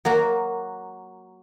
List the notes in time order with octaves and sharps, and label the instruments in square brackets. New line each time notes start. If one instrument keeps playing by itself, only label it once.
[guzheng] F#3 A#3 F#4